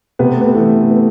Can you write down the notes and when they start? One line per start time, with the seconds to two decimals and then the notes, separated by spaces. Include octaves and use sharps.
0.19 C3 B3
0.30 A3
0.41 B3
0.55 E3 A3
0.90 B3